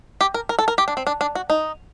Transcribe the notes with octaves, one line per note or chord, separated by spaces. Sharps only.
G4
A#4
A#4
A4
A#4
G4
D4
C4
D4
D4
F#4
D#4